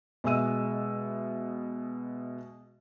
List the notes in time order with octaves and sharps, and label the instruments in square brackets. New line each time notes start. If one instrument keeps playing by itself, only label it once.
[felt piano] B2 G#3 E5 E6 D#7